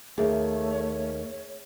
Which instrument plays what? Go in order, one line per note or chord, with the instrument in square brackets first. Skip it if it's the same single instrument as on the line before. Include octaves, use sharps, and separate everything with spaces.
[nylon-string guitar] D#2 [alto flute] A3 [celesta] G#4 E5 [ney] C#5